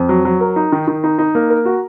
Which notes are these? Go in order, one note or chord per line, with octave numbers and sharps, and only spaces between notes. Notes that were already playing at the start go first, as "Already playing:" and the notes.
Already playing: F2
F#3
F#3
A#4
D#4
D#3
D#3
D#4
D#4
A#3
A#4
F#4